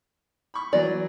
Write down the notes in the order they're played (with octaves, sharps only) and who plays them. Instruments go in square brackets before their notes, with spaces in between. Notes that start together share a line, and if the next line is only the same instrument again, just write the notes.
[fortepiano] B5 C#6
[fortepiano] E3 F#3 [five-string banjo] D5